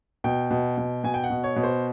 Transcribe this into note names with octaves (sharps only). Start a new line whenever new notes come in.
B2 G5
B2
B2
B2 G#5
G5
F#5
B2
C#5
B2
C5